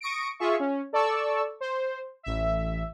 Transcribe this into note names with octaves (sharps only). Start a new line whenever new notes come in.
C#6 D#6 A#6 C#7 D7
F4 G#4 E5 C#6
C#4
A4 D5 A5 C#6 E6
C5
A1 E5